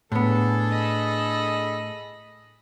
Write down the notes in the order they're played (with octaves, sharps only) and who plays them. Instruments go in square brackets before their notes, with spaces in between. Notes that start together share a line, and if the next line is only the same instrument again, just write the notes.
[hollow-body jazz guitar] A2 B3 [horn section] D4 G#4 A4
[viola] D#5 B5